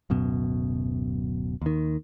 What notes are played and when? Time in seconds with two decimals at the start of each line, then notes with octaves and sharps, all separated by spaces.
0.10 D1 F#2 B2
1.62 D#2 D#3